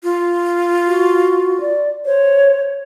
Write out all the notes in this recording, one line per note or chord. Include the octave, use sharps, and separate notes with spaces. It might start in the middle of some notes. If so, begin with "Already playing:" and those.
F4
F#4
D5
C5 C#5